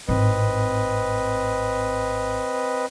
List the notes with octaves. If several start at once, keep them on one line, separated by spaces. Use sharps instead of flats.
G#1 A2 C4 B4 D#5